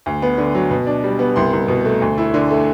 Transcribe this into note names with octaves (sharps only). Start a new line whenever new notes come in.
D2
B3
D3
F#3
B2
D4
G3
B3
C2 C6
C2
B2
A3
D2
E4
D3
A3